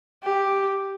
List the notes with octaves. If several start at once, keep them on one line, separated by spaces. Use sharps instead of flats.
G4